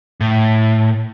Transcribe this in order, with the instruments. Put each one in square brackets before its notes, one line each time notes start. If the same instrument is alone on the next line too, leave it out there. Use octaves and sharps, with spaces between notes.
[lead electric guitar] A2